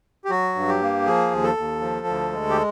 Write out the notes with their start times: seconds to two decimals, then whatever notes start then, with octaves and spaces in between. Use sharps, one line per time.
0.25 G4
0.30 F#3 F#4
0.55 G2
0.69 G4
0.81 A#3
1.06 F3 G#4
1.31 D#2
1.43 A4
1.57 D#2
1.81 F3
2.07 D2
2.32 G#3
2.50 G4